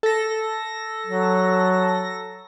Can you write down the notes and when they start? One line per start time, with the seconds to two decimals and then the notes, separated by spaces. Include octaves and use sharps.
0.03 A4 A#6
1.07 F#3